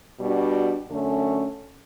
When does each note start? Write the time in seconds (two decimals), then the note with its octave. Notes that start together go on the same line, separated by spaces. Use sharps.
0.20 B2 G3 D4 F#4
0.91 F#2 D3 A3 C#4